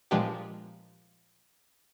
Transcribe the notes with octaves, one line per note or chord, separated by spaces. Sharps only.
A#2 F3 G#3 B3 D4 G4